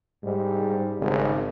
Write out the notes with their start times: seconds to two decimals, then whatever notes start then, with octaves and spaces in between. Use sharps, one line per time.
0.24 G#2 G3
0.99 G#1 G#2 C#3